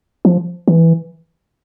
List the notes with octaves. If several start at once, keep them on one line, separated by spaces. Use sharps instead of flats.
F3
E3